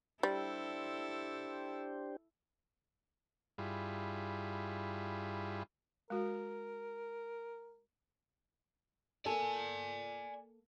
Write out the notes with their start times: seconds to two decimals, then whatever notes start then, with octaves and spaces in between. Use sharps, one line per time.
0.23 G3 D4 E4 G4 A4 C5
3.58 G2 G3 E4 F4 G#4 B5
6.10 G#3 F#4 A#4
9.26 A#3 A4 D5 G#5